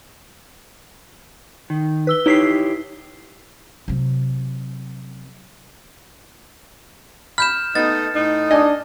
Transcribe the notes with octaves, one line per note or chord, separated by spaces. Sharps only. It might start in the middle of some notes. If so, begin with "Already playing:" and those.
D#3
B4 E6 G7
D#4 E4 G4 C#5 B6 C7
C3 F#3
B5 F6 G6 E7
A3 B3 D#4 A6
A2 D#4
D4 D#5 G#5